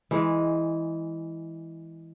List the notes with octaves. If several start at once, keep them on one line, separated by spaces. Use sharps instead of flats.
E3 G#3